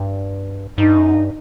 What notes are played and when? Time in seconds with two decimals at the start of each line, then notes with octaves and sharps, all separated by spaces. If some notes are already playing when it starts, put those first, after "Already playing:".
Already playing: G2
0.78 G2 D#4
0.97 F#2
1.14 G2